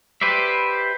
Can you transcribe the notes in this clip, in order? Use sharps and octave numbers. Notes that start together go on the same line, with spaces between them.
G4 B4 C5 D5 E5